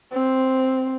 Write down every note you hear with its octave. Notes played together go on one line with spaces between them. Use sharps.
C4